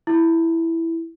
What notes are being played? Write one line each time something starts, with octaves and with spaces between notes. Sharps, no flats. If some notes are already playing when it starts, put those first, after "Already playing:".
E4